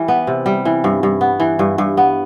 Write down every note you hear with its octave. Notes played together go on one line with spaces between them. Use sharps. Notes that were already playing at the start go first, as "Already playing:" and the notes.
Already playing: E3 G3
B3
C3
G3
E3
G2
G2
B3
E3
G2
G2
B3